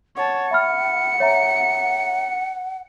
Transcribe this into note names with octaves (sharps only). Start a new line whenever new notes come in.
C#5 F#5 A5
E5 B5 F6 C#7
C#5 E5 A#5